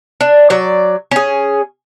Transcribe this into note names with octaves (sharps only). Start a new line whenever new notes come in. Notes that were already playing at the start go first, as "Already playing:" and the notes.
D4
F#3 D5
C#4 G#4